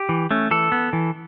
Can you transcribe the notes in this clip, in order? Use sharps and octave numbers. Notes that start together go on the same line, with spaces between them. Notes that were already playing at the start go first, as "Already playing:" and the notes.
Already playing: G4
E3
A3 C#4
E3 A4
B3
E3